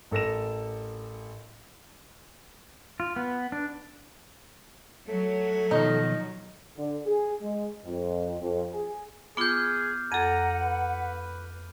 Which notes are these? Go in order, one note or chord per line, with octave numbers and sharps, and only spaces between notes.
A1 A4 A#4 A#6 E7
F4
B3
D4
F#3 A3
B2 D#3 F3 D#4
D3
G#4
G#3
F2
F2
G#4
B3 F4 G#4 D6 F6 G6
F2 A4 F#5 A#5 D#7
B4